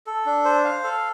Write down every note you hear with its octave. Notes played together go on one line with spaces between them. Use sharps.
A4
D4
C5
F5
A4